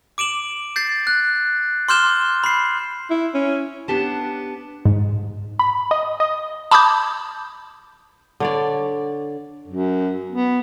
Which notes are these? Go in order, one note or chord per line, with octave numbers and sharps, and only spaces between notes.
D6 D7 E7 F#7
G6 A6 C7
F#6
C6 D6 F6 G6 E7 G7
B5 C7
E4
C#4
B3 D4 G4 A5
G#2
B5
D#5
D#5
A5 B5 D6 D#6 G6
D3 C#5 D5
F#2
B3